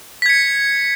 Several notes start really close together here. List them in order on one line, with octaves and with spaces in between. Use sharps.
B6 G#6 C#7